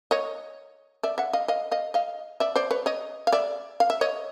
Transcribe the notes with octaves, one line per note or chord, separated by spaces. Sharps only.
C#5 D#5
D5 E5
E5 F#5
D#5 F5
D#5 F5
D#5 F5
D#5 F5
D5 E5
C5 D5
B4 C#5
C#5 D#5
F5
D5 E5
F5
E5
C#5 D#5